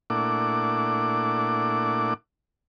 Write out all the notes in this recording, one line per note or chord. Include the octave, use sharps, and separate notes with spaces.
A#2 A3 D4 E4 F#5 D6